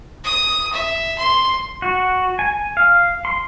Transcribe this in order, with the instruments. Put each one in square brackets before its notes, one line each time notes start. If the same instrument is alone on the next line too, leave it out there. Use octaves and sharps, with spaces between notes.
[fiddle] D#6
E5
C6
[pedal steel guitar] F#4
G#5
F5
C6